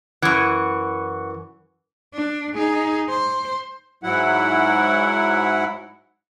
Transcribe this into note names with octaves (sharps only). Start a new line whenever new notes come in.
F#2 E3 F#5 C#6
D4
D#4 G#4
C5
G#2 F#3 E4 F#5